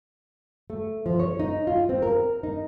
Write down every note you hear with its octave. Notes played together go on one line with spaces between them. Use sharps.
A3
F3
C#5
D#4
F4
C4
A#4
D#4